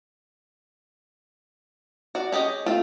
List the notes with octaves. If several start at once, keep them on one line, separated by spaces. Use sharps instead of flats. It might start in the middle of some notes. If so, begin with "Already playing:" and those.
F#4 D5
C#4 G4 G#4 D#5
A3 C4 F4